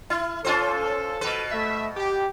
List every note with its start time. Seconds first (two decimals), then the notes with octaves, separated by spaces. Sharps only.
0.10 E4
0.45 C#4 F4 A4 C5
1.21 B2 B4
1.52 A3 E5
1.97 G4